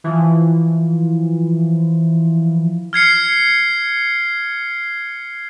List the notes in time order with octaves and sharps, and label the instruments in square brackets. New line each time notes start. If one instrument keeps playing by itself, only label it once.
[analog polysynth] E3 F3
[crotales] F6 G#6 C7 C#7